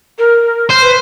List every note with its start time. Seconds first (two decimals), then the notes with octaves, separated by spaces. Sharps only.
0.19 A#4
0.70 C5
0.82 B4